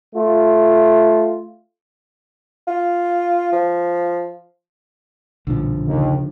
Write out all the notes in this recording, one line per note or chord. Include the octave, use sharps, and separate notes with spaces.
A3 F4
F4
F3
B1 G2 A#2 D3 F3
D#2 C#3